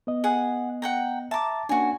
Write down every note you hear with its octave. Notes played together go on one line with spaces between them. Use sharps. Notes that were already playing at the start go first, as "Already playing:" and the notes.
B3 D#5
G#4 F#5
F#5 G5 A#5
E5 A5 A#5 D6
A#3 C#4 D4 F#4 G#5